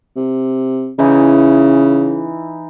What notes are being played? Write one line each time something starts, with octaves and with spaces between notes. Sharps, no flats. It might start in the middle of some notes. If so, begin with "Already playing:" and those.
C3
C#3 E3 D#4